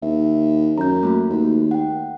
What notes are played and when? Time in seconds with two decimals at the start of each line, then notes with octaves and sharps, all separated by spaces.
0.02 D#2 E5
0.78 F#2 A#5 G6
1.03 A3 A#3 F#4
1.30 D#2
1.71 F#5 G5